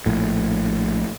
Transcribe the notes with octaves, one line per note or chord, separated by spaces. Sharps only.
A#1 A2